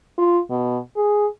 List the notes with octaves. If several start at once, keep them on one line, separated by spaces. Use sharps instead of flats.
F4
B2
G#4